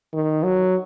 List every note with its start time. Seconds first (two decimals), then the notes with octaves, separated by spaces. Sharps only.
0.13 D#3
0.43 F#3